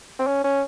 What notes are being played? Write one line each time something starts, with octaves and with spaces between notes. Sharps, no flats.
C4
C#4
C#4